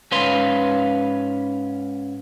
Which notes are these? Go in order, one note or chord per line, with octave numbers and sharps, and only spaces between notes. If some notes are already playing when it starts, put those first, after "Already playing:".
G#2 C#4 B4 F5 C6